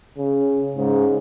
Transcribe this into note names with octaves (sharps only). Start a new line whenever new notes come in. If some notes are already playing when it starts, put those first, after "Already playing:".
C#3
G#2 C#3